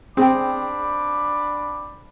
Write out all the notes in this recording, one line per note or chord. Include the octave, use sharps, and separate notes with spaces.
C4 D4 G#4 G5 B5 D6